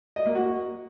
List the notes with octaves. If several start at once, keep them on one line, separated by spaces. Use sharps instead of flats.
D#5
A#3
F#4